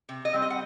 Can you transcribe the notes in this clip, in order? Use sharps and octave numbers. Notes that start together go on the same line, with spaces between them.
C3
D#5
G3 C4
D#5
F#5